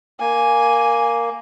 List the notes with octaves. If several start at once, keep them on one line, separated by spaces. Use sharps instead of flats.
A#3 G#5